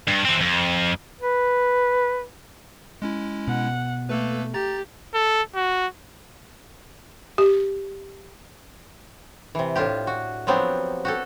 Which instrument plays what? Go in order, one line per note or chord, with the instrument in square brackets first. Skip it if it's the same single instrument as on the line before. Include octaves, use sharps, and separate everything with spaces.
[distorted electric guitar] G2
E3 C4
F2
[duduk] B4
[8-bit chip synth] G#3 C#4 E4
[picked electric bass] B2 [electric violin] F#5
[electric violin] A3 [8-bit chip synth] A#3 A4 B4
[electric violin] G4 [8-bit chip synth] A#5 A6
[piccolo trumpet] A4
F#4
[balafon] G4
[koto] C3 E3
A2 D4 F4 G4
F#4
F3 F#3 B3 C4 D4 G4
F#4 G4 A4